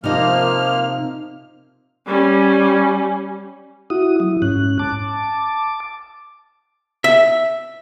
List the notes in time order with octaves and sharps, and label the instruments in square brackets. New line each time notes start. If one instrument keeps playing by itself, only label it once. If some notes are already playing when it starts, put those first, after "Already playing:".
[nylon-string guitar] C3 D#4 [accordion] F3 A#3 F6
[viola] G3 C#4
[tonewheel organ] E4 F#4 D#6
F#3 E4
G#2 C#4 F#6
A5 D6
[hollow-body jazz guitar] E5